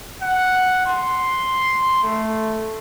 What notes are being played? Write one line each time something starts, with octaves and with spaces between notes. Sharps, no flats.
F#5
C6
A3